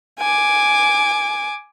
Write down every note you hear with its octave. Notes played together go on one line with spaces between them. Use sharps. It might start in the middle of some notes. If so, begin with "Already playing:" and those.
G#5 D6